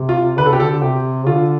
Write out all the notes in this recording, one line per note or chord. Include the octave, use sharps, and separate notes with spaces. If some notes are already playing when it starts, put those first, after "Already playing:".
Already playing: C3
F4
D3 B4
A4
C3 G4
A4
D3
C3 G4
D3 F4